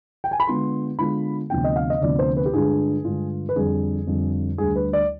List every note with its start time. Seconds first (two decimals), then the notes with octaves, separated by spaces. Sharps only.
0.24 G5
0.31 G#5
0.40 B5
0.47 D3 G#3 B3 F4 C6
0.99 D3 G#3 B3 F4 B5
1.50 D2 C3 F3 B3 D4 G5
1.64 D#5
1.76 F5
1.90 D#5
2.01 D2 C3 F3 B3 D4 D5
2.19 C5
2.37 B4
2.46 G4
2.53 G2 D3 G#3 D4 F4 G#4
3.04 G2 D3 G#3 D4 F4
3.49 B4
3.56 F2 D3 G3 G#4
4.07 F2 D3 G3
4.58 D2 D3 G3 G#4
4.76 B4
4.93 D5